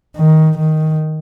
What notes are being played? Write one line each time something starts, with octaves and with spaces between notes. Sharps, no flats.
D#3
D#3